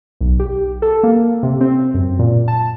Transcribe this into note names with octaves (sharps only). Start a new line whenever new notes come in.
B1
G4
A4
A#3
C3
C4
F#2
A#2
A5